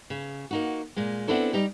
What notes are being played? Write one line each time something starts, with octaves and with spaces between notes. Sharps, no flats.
C#3
A#3 D#4 F#4
A#2 G#3
B3 C4 D4 E4 A4 C#5
G3 D#4 G4